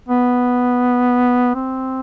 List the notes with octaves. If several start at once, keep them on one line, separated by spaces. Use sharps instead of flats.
B3
C4